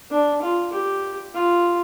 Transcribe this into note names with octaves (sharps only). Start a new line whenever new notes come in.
D4
F4
G4
F4